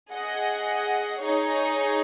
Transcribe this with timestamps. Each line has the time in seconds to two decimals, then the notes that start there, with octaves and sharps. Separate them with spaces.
0.12 G#4 D#5 F#5
1.19 D#4 G#4 C#5